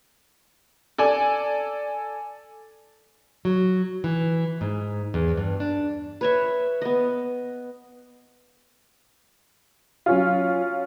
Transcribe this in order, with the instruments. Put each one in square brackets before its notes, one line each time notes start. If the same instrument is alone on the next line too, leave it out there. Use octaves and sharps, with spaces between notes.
[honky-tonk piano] A4 D5 G#5
[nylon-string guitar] F#3
E3
G#2
E2
G2
D4
[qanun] B4 C#5 E5
B3 D#5
[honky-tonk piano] F#3 C#4 F4